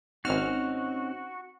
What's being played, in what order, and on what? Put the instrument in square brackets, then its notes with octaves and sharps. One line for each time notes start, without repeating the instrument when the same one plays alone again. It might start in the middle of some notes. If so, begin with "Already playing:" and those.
[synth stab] G#1 F6 [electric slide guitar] C4 C#4 D#4 [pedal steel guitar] F#4